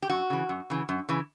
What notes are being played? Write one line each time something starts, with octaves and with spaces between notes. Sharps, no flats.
G4
F#2 F#4
C#3 E3
F#2
C#3 E3
F#2
C#3 E3